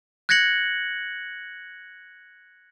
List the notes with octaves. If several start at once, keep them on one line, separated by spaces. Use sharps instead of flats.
F#6 G#6 A#6 C#7 F#7